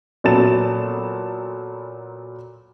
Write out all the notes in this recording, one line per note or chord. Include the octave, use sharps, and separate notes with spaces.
A#2 F#3 B3 A4 A6 E7